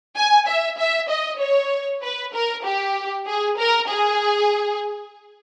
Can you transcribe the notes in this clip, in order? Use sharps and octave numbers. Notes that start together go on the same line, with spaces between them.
G#5
E5
E5
D#5
C#5
B4
A#4
G4
G#4
A#4
G#4